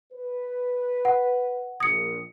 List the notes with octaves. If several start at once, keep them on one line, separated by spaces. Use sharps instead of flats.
B4
F#5
A#1 D#6 C#7